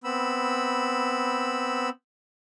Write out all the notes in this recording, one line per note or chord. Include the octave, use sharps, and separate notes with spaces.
B3 C4 B5 E6